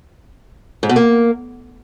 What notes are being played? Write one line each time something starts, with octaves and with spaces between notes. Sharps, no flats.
G#2
B2
A#3